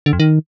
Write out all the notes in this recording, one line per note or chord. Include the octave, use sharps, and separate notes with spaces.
D3
F2
D#3